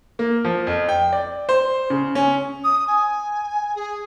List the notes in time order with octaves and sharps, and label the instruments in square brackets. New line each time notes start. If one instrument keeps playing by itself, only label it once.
[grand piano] A#3
F3
F2
G5
D5
C5
C#3
C#4
[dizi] D#6
G#5
G#4